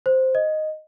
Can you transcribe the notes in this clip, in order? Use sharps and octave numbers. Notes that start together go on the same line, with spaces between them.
C5
D#5